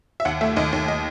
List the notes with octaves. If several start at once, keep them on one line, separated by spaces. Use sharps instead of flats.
E5
D#2 F#5
A3 E5
D#2 D#5
D#2
D#5